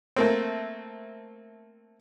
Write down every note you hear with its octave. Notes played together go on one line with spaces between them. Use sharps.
A3 A#3 C4